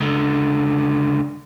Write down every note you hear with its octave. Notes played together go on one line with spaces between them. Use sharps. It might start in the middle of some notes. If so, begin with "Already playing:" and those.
C#2 D3